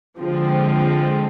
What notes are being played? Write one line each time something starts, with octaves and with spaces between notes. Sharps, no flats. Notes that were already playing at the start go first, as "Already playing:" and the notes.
D3 F3 G#3 C4